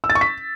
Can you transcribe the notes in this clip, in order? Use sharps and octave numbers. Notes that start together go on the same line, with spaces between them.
E6
A6
C#6
B6